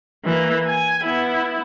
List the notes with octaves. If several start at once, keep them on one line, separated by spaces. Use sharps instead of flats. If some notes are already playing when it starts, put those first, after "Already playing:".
E3 A#3
G#5
B3 E4